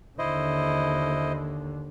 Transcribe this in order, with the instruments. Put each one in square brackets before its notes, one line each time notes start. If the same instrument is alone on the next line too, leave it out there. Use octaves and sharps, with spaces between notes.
[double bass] D#2 D3 [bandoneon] E4 C5 D#5